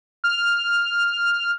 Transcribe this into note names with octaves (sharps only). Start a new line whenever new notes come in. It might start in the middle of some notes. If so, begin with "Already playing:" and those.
F6